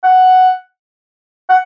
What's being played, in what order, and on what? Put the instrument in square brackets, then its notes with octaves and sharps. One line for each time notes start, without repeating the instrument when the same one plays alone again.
[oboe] F#5
F#5